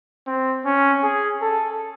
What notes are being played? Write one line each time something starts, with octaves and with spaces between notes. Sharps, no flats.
C4
C#4
G#4
A4